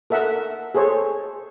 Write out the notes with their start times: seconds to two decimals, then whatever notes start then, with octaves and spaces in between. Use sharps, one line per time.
0.10 A4 A#4 E5 F#5
0.74 G#4 A4 C5 C#5